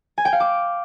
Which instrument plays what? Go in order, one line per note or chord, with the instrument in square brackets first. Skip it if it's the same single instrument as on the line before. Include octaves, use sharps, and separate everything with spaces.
[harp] G#5
G5
F5
D6